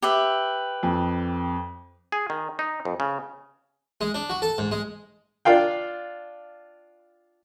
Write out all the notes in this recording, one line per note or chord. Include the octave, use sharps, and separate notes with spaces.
G4 B4 E5
F2
G#4
D#3
D#4
F2
C#3
G#3
D4
F#4
A4
G#2
G#3
D4 F4 F5 G5